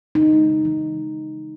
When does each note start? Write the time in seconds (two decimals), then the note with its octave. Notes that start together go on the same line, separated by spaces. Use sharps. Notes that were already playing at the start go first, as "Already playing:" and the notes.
0.15 C#3 D#4
0.33 G#3
0.50 C#3
0.65 E3